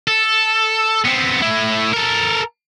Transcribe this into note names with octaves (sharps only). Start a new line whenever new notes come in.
A4
B3 C4
A2 E4
A4 A#4